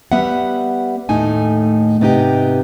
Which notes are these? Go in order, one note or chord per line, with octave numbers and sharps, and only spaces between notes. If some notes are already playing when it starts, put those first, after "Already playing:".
G3 B3 E5 F#5
D#2 A2 A3 D#4 G#5
G#2 C3 B3 D#4 E4 G4